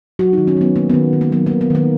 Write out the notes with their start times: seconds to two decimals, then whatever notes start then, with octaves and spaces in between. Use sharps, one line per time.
0.19 F#3 F#4
0.33 D#4
0.38 D#3
0.47 C#4
0.57 F#3 B3
0.76 D#3 A#3
0.89 D#3 B3
1.13 D#3
1.21 A#3
1.32 F#3 B3
1.46 A#3
1.51 D#3
1.61 B3
1.70 D#3 A#3